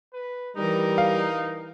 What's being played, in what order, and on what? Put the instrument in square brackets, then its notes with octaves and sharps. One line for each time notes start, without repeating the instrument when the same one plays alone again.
[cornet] B4
[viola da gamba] E3 A#4 [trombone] G3 [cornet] D#4
[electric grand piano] F5